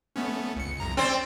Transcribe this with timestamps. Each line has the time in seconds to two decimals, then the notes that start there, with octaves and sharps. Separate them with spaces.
0.16 A3 B3 C#4
0.56 C#2 C#7
0.80 C2 F2 A#5
0.97 C4 C#4 C5 D5 A6